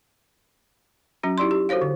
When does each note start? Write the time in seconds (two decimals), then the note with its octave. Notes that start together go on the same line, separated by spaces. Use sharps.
1.23 F#3 C#4 F#4
1.38 D#4 E4 G4 D5 C6
1.51 G4
1.69 F#4 A4 C5 C#5 F5
1.81 D3